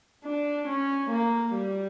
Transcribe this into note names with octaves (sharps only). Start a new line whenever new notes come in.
D4
C#4
A#3
G3